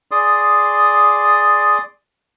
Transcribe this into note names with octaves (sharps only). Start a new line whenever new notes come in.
G#4 D5 C6 D#6